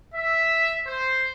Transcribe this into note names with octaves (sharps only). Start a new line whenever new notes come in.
E5
C5